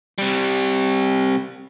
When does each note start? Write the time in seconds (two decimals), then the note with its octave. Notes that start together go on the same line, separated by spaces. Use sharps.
0.18 C3 G3